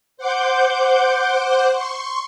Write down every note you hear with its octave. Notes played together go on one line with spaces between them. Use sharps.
C5 F#5 D6 G6
C6 C#6